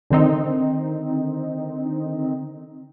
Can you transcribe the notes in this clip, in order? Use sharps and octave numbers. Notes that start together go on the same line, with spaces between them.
D3 D#3 C4 D#4